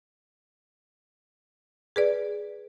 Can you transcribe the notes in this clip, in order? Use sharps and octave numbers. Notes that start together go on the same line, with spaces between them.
G#4 B4 D5